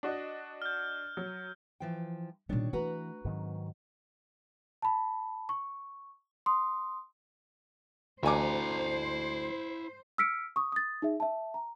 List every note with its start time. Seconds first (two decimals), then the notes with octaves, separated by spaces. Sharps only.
0.03 D4 F#4 D#5
0.62 F6 G6
1.17 F#3
1.80 E3 F3 G5
2.49 A#2 D#3 G3 C#4 D4 C#5
2.73 E3 A3 F#4 B4 A#5
3.25 G#2 D#3 F#3 C4
4.82 A5 B5
5.49 C#6
6.46 C6 D#6
8.23 A1 D2 E4 C5 G#5 A#5 D6
10.18 E6 F6 B6 C#7 D7
10.56 C#6 D#6
10.72 D#6 A6
11.02 D#4 G#4 E5
11.20 E5 A5
11.54 A#5